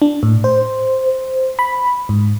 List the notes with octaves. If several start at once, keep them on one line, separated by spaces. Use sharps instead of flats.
D4
A2
C5
B5
G#2